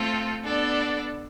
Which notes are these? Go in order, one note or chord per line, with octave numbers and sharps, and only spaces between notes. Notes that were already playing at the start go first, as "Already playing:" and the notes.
Already playing: A3 C4 F4 A4
B3 D4 A4 D5